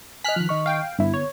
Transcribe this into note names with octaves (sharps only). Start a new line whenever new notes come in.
D#5 G#5 F6 F#6 B6
D#3 F3
D#3 D#5 C#6
F5 G5
G2 D3 B3 E4
C#5